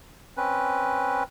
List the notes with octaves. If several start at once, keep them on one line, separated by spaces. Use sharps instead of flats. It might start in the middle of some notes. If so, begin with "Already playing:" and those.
C4 C#4 B4